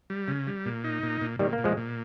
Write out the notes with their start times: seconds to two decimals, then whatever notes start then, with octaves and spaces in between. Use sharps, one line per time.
0.10 G3
0.28 C#3
0.47 G3
0.66 A#2
0.84 D#4
1.03 A#2
1.21 A#2
1.39 A#2 D#3 G3
1.53 A#3
1.58 A#2
1.64 F3 G#3
1.77 A#2